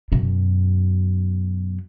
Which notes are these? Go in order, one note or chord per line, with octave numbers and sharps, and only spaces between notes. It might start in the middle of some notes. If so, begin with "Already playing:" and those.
F#2 B2